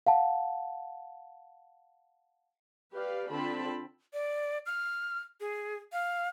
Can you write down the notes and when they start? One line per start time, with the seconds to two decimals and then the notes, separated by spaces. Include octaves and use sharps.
0.07 F5 F#5 A5
2.92 G4 B4 D5 F5
3.30 D3 C4 F4 A5 B5
4.13 D5
4.66 F6
5.40 G#4
5.93 F5